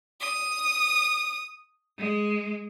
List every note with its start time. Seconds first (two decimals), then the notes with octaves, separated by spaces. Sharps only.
0.20 D#6
1.98 G#3